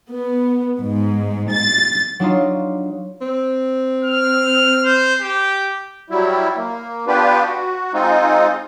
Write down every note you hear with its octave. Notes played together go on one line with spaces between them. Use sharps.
B3
G#2
A6
F#3 D4 D#4 F4
C4
F6
C5
G4
F#3 G3 E4
A#3
B3 D4 F4 G4 B4
F#4
G#3 C4 D#4 F4